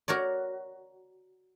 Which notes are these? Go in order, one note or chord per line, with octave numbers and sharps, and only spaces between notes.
F#4 A#4 C#5 D5